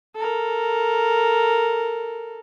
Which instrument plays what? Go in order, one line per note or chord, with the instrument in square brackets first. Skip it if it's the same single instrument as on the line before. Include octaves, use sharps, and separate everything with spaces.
[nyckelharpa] A4 A#4